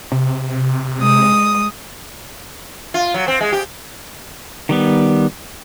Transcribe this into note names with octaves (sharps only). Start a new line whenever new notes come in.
C3
G#3 D#6
F4
F#3
C4
G#3
G4
D#3 G3 B3